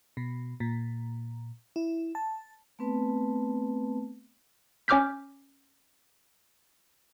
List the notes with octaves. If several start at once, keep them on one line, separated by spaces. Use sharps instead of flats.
B2
A#2
E4
A5
A3 B3 C4 B4 A5
C#4 C#5 D6 F6 G6 B6